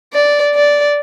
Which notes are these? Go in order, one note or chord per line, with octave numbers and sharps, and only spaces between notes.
D5
D5